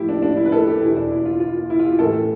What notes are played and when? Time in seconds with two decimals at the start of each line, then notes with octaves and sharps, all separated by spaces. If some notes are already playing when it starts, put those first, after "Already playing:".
Already playing: A2 F3 E4 G4
0.09 D4
0.23 D4
0.37 E4
0.46 B4
0.52 A4
0.67 G4
0.82 E2 B2 E4
0.96 D4
1.11 E4
1.25 F4
1.40 F4
1.55 F4
1.70 E4
1.79 F4
1.85 G4
1.99 A2 E3 A4